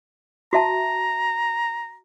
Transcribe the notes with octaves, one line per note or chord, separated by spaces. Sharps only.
F#4 E5 A5 A#5